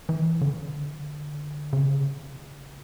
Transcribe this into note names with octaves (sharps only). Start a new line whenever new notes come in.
E3
D3
C#3